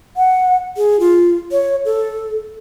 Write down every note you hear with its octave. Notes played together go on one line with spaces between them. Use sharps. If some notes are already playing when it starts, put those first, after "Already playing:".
F#5
G#4
F4
C#5
A4